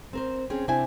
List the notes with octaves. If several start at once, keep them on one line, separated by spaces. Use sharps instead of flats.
C4 A#4 C5
C4 C#4 G#4
C3 C4 D4 E4 G#5